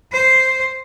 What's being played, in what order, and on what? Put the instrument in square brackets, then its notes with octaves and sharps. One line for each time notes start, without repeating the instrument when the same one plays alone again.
[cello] C5